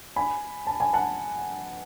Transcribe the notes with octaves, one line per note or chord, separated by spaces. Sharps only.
G#5 B5
A5
G#5
F#5 A5